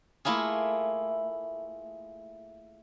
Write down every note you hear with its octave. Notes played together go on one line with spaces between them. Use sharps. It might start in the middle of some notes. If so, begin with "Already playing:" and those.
A3 A#3 E4 F4 G#4